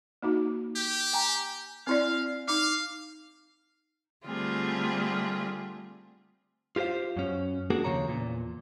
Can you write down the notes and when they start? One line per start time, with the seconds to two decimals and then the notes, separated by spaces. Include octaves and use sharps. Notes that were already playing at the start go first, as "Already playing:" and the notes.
0.22 A#3 D#4 F#4
0.76 G4
1.13 G5 G#5 A#5
1.87 C4 E4 D5 F5
2.48 D#4 F5 D6
4.26 D3 G3 A3 C4 F4 G#4
6.76 F4 G4 A4 C5 F5
7.17 F#2 C#4
7.70 A#3 D4 F#4 G#4 A#4
7.84 D#2 A#2 C#3 F3 C#5 A#5
8.08 E2 A#2